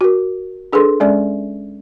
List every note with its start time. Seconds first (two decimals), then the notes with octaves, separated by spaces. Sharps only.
0.01 F#4 A#4
0.73 D4 G#4 A4 B4 C6
1.00 G#3 C#4 D5 E5